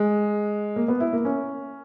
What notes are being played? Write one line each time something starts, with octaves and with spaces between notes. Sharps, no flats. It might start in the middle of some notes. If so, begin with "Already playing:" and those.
Already playing: G#3
A#3
B3
E4
A#3
C#4